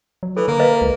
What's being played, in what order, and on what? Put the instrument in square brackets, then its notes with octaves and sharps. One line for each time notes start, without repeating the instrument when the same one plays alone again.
[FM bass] F#3
[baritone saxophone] E3 [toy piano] A4
[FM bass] D3 [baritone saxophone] A#3
[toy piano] B4 D#5 F5
[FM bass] C#2